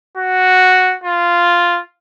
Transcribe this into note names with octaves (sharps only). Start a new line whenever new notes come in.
F#4
F4